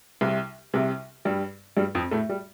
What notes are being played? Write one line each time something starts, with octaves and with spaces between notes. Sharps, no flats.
C2 C3
C2 C3
G2 G3
G2 G3
F2 F3
A2 A3
G3